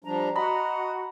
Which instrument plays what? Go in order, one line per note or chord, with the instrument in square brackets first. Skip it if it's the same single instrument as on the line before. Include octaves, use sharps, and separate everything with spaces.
[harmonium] F3 G3 D4 [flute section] A#5
[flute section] F#4 [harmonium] D#5 [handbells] A#5 B5